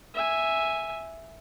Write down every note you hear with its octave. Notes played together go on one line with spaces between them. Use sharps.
E5 G#5